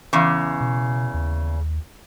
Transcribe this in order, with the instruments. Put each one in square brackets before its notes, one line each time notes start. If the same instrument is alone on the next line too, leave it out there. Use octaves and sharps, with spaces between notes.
[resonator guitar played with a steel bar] E2 C#3
[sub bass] B2
D#2